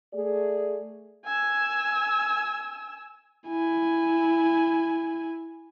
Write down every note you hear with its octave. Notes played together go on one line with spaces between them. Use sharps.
A3 G#4 D5
G#5 E6
E4 G#5